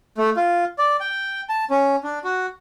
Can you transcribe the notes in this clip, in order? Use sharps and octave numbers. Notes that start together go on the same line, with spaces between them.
A3
F4
D5
G5
A5
C#4
D4
F#4